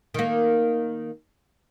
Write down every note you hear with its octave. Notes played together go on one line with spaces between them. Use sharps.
D#3 A#3